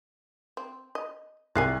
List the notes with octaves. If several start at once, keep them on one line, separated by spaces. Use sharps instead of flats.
C4
D#5
C2 G#4 A#4 G#5 F#6 C7